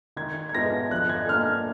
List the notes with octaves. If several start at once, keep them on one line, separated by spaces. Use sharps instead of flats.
D#3 G#6
G#6
G#3 B3 D4 F4 A#6
F3 F#6
G#6
A#3 D4 F6